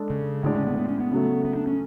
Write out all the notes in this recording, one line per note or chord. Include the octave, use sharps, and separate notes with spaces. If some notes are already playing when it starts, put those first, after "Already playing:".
Already playing: G#3 D4 A4
C#3
A2 D3 G#3 D4 G#4 D5
C#4
B3
B3
C#4
B3
C#3 F#3 A3
B3
D4
C#4